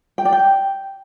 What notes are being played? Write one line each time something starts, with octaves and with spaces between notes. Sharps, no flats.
G5
D5
G5